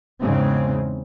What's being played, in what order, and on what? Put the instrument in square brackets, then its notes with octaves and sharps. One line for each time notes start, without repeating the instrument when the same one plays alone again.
[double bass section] E2 G#2 C#3 G#3 C4